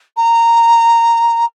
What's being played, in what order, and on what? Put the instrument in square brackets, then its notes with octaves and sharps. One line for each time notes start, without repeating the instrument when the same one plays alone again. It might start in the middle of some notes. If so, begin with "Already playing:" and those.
[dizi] A#5